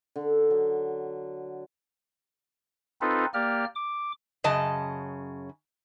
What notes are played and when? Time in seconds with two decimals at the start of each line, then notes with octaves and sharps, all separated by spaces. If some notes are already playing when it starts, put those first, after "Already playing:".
0.16 D3
0.50 F#3
3.01 C4 D#4 F4 A4 B4
3.34 A#3 G4 D5 F6
3.75 D6
4.44 F#2 C#3 D#5 A5